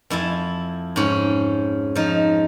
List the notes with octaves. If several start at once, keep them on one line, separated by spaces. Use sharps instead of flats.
F2 E4 G#5 A5
G#2 C#4
F3 D#4